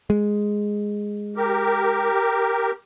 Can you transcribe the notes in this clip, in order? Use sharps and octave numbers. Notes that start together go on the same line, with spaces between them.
G#3
G4 A#4